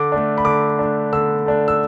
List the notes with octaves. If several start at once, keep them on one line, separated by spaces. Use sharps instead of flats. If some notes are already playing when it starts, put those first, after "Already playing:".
Already playing: D3 D6
A3 D4
B5
D3 D6
A3 D4
D3 E6
A3 D4
E6